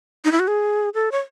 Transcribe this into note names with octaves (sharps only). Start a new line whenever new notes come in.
D#4
E4
F#4
G#4
A4
C#5